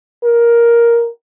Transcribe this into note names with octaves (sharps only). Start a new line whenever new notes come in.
A#4